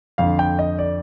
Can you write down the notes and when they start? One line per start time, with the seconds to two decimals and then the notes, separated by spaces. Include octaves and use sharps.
0.18 F2 D3 F5
0.39 G5
0.59 D#5
0.79 D5